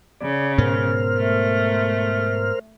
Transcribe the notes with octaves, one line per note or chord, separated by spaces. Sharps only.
C#3 D5
G#2 B2 B3 A#4 C5 F6
A3